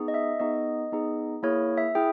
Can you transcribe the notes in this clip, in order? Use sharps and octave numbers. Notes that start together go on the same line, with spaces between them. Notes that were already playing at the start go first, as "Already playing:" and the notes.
Already playing: B3 D#4 G#4
D#5
E5
B3 D#4 G#4 D#5
B3 D#4 G#4
A#3 E4 G#4 C#5
E5
E4 G#4 G5